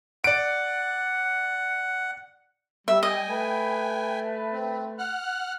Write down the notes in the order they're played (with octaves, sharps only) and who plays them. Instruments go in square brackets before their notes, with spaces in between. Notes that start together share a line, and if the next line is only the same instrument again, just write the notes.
[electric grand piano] D5 D7 [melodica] F#5
[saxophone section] G3 [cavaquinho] E5
[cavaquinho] D#5 [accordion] G5 G#5
[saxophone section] A3 B4
[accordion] C4
F#5 F6 F#6